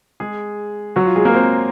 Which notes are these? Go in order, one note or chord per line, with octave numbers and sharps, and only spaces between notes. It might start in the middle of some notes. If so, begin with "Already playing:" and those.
G#3 G#4
F#3 F#4
F4
G#3 G#4
A#3 A#4
C4 C5